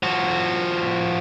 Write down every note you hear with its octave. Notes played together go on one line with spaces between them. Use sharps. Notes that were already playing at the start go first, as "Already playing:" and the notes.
F3 F#4